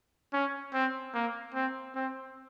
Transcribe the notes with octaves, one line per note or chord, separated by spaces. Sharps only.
C#4
C4
A#3
C4
C4